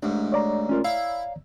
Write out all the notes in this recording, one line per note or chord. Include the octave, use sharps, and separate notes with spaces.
A1 G#2 D4
C#5 D5 A#5
C#4 F4 A#4
E4 F5